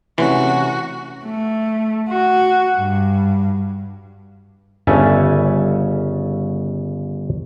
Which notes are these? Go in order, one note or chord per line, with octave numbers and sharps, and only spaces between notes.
C3 E3 A3 C#4 F#4
A3
F#4
G2
G1 C#3 C#4 E5 G#5 A5